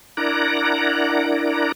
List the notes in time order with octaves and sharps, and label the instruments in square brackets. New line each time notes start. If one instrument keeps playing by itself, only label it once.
[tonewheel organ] D4 E4 A#4 D5 F#5 A#5